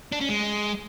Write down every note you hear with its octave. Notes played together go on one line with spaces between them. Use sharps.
D4
C#4
G#3